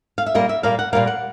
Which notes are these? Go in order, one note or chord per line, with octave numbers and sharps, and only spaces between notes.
F5
E5
A#2 G3 A#3 D#5
E5
A#2 G3 A#3 F5
F#5
A#2 G3 A#3 F5
F#5